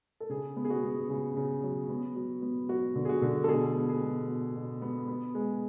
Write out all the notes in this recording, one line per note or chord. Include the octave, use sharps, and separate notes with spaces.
A4
C#3 G#4
B3
G#4
F#4
B3
C#3
C#3
F#3
B3
F#3
B3
F#3 F#4
D3
G#4
F#4
D3
A4
B2 G#4
B3
G#4
B2
B2
B2
B3
B3
G#3